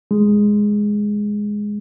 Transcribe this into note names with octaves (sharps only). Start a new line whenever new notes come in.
G#3